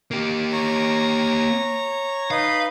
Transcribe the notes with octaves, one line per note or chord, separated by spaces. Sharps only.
A#3 G4
C#5 A#5
D#4 B4 D#5 F5